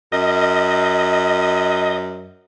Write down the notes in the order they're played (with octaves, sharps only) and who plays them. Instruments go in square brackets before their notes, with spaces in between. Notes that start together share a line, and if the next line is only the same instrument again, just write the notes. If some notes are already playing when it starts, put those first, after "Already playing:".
[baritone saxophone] F#2 [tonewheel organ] D#5